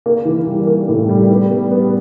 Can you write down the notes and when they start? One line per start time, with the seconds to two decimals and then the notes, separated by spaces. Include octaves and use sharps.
0.06 A#3
0.25 E3
0.47 G3
0.67 A#3
0.88 A2
1.09 G3
1.29 B3
1.50 B3
1.71 B3